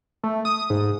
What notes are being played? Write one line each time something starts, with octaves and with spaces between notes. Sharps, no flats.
A3
D#6
G#2